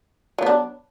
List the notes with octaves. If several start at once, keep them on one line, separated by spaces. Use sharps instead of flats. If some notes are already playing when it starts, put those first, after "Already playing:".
F#3 B3 D4